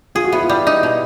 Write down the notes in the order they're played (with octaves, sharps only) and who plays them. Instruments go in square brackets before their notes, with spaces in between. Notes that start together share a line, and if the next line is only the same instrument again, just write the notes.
[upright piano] F4 [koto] G#4
[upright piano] F#4
[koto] B3 [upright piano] E4
[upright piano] F4
[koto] G3
D#4
B2